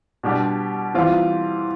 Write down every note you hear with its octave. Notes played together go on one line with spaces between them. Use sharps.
B2 G3 D4 G4
E3 G3 C4 F4